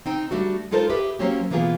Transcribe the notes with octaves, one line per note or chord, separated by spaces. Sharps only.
C4 D#4 G5
G3 A3 D4 F#4
G#3 D#4 F4 A4 A#4 C5
G4 G#4 B4 E5
F#3 A#3 C4 C#4 F#4 G4
B2 E3 A#3 B3 F4 G#4